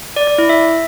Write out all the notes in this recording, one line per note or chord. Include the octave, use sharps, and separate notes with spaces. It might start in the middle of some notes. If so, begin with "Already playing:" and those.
D5
D5
E4
E5